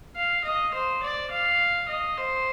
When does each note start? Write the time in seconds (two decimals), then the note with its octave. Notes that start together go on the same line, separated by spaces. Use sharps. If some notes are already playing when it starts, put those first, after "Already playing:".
0.16 F5
0.45 D#5
0.74 C5
1.03 D5
1.31 F5
1.89 D#5
2.18 C5